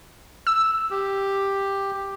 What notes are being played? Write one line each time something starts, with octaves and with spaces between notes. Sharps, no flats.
E6
G4